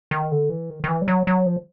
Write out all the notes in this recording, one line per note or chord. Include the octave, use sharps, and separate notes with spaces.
D#3
D3
E3
D#3
D#3
E3
G3
F#3
F#3
F3